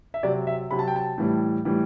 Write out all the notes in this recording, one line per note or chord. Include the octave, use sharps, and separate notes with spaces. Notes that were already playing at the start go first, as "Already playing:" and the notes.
E5
C3 F#3 D5
E5
C3 F#3 B5
A5
G5
A5
A2 E3 G3
A2 E3 G3